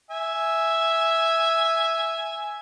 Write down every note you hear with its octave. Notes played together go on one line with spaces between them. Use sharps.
E5 G#5